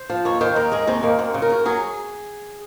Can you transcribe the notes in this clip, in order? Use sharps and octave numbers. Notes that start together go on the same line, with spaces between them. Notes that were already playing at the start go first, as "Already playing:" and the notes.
Already playing: C5
F3
D#2 C#5
D#3 C5
D#2 A#4
G#3 G#4
D#2 C4
D#3 A#3
F#2 C4
C#3
A#4
F#2
F#3 G#4